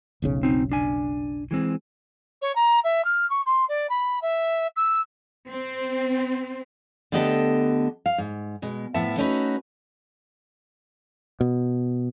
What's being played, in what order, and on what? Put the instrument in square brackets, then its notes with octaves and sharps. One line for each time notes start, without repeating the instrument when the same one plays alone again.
[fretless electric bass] F1 B1 C#3
[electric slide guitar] C4 D#4
D4 G#5
E3 G#3 C4
[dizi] C#5
A#5
E5
F6
C#6
C6
D5
B5
E5
E6
[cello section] C4
[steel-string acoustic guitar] D3 A3 B3 G4 D#5 A5
F5
G#2
B2 G#3
A2 F3 B3 E5 A5
A3 C#4 D#4 F#4 B4
[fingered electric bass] B2